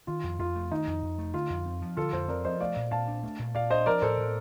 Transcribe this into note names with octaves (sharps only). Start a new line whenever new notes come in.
D#3 F4
F2
F2 F4
A3
D#3 D#4
F2
F2
A3
D3 F4
F2
C4
F3
D3 F4 A4
F2 A4 C5
C4 A#4 D5
F3 C5 D#5
A3 D5 F5
A#2
A#2 F5 A5
D4
A3
A#2
A#2 D5 F5
D4 C5 D#5
F3 A#4 D5
A2 A4 C5
A2